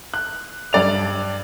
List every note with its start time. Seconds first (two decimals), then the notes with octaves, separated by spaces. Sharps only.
0.14 F#6
0.73 G2 D5 F7